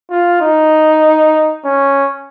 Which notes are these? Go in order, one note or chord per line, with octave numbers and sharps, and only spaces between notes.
F4
D#4
C#4